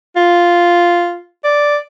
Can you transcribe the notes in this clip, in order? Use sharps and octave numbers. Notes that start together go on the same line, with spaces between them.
F4
D5